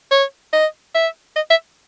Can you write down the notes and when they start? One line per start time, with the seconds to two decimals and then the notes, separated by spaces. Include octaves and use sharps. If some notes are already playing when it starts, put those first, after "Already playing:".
0.11 C#5
0.53 D#5
0.95 E5
1.36 D#5
1.50 E5